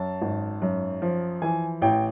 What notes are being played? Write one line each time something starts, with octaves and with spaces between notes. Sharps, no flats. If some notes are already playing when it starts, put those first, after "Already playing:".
Already playing: F#2 A5
G#1
F#2
F3
E3 G#5
A1 G5